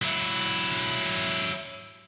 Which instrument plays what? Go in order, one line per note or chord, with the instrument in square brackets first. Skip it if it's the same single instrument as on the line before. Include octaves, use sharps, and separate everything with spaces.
[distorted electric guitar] F#3 E4